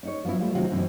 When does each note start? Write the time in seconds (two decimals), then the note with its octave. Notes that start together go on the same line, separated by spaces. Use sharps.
0.03 C#4 D#4 C#5
0.25 F3 F#3 B3 C#4 E4
0.40 F3 G3 A3
0.54 C3 D#3 F#3 C#4 F4 F#4
0.71 F#2 B2 D#3 E3 C4